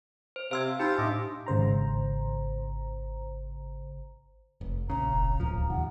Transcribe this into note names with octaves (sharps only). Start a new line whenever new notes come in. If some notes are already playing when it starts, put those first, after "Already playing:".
C5
C3 C5 F5 C6 E6 G#6
D#4 F4 G4 C5 A5 B5 C6
A2 D4 D#5 E5 D6
G#1 C#3 C5 A#5
F1
A#1 C#3 A#5
F1
D1 C#2 F3
D#2 B2 F#5